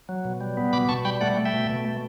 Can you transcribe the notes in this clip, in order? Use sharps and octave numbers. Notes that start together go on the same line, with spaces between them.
F#3
B2
G3
B3
B2 B5 D6
B2 A5 C#6
G3 G5 B5
A3 D5 F#5
A3
E5 G5
B2
B2
A3